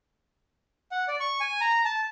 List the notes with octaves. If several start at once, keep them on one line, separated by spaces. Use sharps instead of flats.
F#5
D5
C#6
G#5
A#5
A5